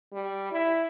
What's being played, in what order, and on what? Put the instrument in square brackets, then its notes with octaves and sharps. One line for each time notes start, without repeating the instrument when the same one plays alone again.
[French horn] G3
E4